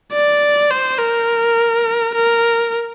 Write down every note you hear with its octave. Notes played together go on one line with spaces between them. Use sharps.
D5
C5
A#4
A#4